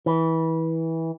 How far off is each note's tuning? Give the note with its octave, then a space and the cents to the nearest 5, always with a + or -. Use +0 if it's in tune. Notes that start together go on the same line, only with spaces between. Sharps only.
E3 -20